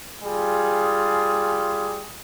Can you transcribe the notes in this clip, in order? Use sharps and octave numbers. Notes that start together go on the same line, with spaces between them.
G3 F4 G#4